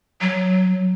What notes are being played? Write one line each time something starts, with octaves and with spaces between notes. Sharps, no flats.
F#3